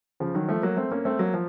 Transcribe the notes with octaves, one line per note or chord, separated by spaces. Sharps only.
C#3 F3
D#3 F#3
F3 A3
F#3 A#3
A3 C4
A#3 C#4
A3 C4
F#3 A#3
F3